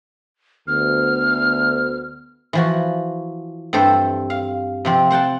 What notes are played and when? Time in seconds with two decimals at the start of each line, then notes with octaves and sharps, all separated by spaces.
0.67 D2 B3 F6
2.53 E3 F3 F#4
3.73 G2 C4 A4 C5 E5
4.30 F5
4.85 C3 F3 C4
5.10 C5 F#5 G5 A5